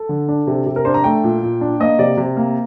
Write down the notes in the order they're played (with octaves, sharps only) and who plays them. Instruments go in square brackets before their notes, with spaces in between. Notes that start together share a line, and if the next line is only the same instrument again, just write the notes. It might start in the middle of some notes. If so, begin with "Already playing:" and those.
Already playing: [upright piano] A4
D3
D4
C3
C3
A#4
D4 C5
A#5
A3 G5
A#2
A#2
D4
A#3 D#5
C3 D5
C3
A#3